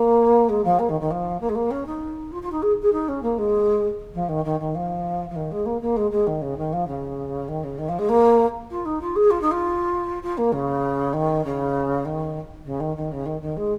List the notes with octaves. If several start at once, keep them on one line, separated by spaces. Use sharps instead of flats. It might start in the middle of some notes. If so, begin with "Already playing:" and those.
Already playing: A#3
G#3
F3
A#3
D#3
D#3
F3
A#3
G#3
A#3
C#4
D#4
F4
F4
D#4
G#4
G#4
D#4
C#4
A#3
G#3
F3
D#3
D#3
D#3
F3
F3
D#3
G#3
A#3
A#3
G#3
G#3
D#3
C#3
D#3
F3
C#3
D#3
C#3
D#3
F3
G#3
A#3
F4
D#4
F4
G#4
F4
D#4
F4
F4
A#3
C#3
D#3
C#3
D#3
C#3
D#3
D#3
C#3
D#3
D#3
G#3